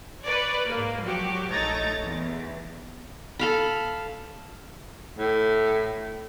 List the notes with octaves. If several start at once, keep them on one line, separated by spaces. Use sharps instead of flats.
B4 C#5 D5
G#2 A#3
F3 F#3 F#4 G4
A#1 A3 D#4 C#5 A#5 A6
E2
A4 F5 B5
A2